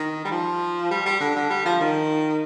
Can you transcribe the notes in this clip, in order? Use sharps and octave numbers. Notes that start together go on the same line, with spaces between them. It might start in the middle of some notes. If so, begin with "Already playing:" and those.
Already playing: D#3
G3
F3
G3
G3
D3
D3
G3
F3
D#3